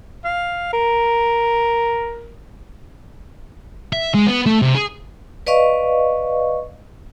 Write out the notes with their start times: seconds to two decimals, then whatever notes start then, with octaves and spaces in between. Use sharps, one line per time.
0.24 F5
0.73 A#4
3.93 E5
4.14 G#3
4.27 B3
4.46 A3
4.62 C3
4.75 G#4
5.47 B4 D5 D#5 F5 C#6